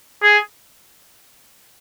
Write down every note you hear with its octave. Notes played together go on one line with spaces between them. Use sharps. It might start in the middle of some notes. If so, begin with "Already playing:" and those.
G#4